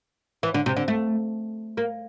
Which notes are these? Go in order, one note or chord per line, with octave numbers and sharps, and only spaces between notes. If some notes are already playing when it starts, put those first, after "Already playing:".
E3
D3
C3
D3
A3
A#3